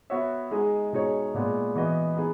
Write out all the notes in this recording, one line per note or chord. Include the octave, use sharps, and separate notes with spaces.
B3 F#4 C#5 E5
G#3 D#4 G#4 D#5
B2 G#3 D#4 G#4 C#5
A#2 G#3 B3
E3 B3 F#4 B4 D#5
B3 D#4 G#4